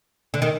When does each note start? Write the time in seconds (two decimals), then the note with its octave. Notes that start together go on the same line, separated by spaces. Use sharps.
0.34 D3
0.42 D#3